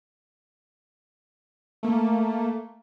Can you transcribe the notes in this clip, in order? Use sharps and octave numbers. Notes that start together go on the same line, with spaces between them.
A3 A#3